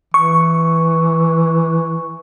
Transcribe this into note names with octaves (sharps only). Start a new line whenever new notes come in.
E3 C#6